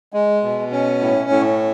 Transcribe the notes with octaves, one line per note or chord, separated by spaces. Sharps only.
G#3
B2
C#4
A2
A2